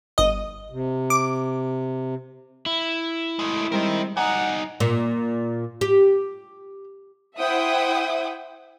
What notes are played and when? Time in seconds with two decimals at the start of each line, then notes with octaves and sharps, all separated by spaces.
0.18 G1 D#5
0.71 C3
1.10 D6
2.66 E4
3.39 G#3 A3
3.72 G3 G#3 C4 A#4 D#5
4.17 G3 D#4 F#5 G#5 A#5
4.80 A#2
5.81 G4
7.38 E4 C5 E5 F#5 G5 D#6